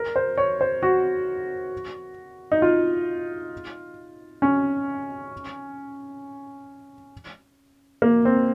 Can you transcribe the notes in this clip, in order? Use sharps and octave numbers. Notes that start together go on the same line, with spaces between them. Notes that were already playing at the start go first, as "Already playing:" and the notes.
Already playing: A#4
C5
C#5
C5
F#4
D#4
F4
C#4
A#3
C4